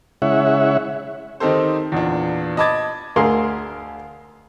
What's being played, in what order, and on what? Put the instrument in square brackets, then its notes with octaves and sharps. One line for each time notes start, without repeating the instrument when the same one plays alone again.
[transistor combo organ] C#3 G#3 E4 C#5 E5 F#5
[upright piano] D#3 C4 D#4 G4 A4 C5
E2 A#2 D4
D#5 A5 B5 D6 G#6 A6
[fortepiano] D2 G#4 A#4 F5 C6